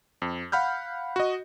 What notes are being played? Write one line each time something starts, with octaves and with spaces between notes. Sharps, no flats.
F2
F5 F#5 B5 F6 G6
F#4 D#5